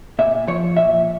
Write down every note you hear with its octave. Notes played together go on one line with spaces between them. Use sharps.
A#2 E5
F3 C#5
A#2 E5